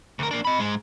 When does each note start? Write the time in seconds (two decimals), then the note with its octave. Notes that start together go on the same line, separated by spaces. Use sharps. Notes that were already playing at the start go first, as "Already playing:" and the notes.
0.19 D2 A#4
0.31 A#3 D4
0.45 D#5 B5
0.60 G#2 G#3